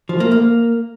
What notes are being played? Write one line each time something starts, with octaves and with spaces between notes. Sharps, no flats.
F3
A#3
A#3